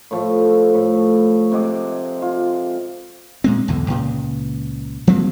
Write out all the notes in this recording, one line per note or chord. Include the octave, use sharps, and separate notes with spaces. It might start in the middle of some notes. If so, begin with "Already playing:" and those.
A2 F3 A3
A2
C3 G#3 D6
F4
A#2 G#3 C4
B1 E2 D3
C#2 A#2 C#3
F3 F#3 A#3 C4